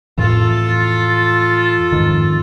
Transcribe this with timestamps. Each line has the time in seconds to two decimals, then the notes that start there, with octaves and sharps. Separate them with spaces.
0.18 F2 A2 E3 F4 A4
1.92 F2 G#2 D#3